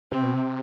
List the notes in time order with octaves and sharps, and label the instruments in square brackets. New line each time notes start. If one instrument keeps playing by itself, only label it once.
[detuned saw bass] C3 [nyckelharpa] C4
[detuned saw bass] B2
C3